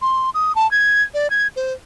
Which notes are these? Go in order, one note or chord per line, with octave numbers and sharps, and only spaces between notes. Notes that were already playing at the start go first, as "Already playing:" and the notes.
C6
D#6
A5
G#6
D5
G#6
C5